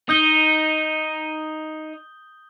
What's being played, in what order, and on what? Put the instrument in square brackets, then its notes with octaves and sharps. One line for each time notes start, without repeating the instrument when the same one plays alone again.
[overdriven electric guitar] D#4 [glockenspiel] D#6 G6 G7